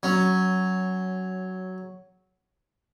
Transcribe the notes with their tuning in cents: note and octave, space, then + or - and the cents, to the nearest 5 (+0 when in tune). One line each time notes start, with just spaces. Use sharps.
F#3 +10 C#4 +0